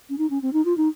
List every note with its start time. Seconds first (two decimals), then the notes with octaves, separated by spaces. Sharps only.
0.09 C#4
0.18 D#4
0.30 C#4
0.42 C4
0.53 D#4
0.65 F4
0.77 D#4